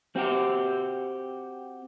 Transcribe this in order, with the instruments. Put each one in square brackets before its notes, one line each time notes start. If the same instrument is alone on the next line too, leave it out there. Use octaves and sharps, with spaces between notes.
[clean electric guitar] C4 F#4 G4